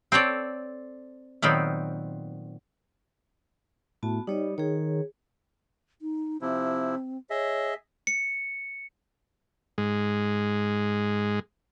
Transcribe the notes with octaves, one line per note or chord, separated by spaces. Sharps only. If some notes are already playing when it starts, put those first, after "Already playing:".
C4 A4 C#5 D5
A#2 D#3 F#3 B3 C4
A2 B3 F#4 A5
G3 D#4 C#5 D#5
D#3 G#4 C#5
D#4
C3 F3 C4 E4
G#4 C#5 D#5 E5
C#7
G#2 G#3